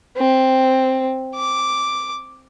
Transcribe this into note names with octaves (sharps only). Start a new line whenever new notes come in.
C4
D6